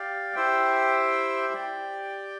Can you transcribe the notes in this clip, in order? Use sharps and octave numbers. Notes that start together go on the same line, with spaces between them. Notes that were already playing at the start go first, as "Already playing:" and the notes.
Already playing: G4 D5 F5
E4 G4 C5 E5 G5
G4 D5 G5